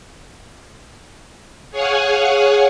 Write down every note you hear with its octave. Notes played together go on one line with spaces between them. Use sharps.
G#4 C#5 F5 F#5 G#5